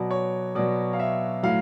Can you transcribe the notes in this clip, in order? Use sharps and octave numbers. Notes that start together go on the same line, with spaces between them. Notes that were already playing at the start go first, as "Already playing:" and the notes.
Already playing: B2 F#3 D5
C#5
B2 F#3 D5
F5
E5
A2 F#3 F5